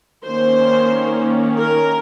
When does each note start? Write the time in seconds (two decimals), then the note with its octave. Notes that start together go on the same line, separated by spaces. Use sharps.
0.24 D#3 A#3 C#4 C5
1.58 A#4